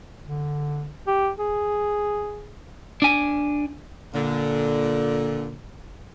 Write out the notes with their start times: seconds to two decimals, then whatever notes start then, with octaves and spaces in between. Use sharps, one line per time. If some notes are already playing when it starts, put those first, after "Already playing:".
0.26 D3
1.07 G4
1.38 G#4
3.02 D4 G#5
4.14 A#2 D3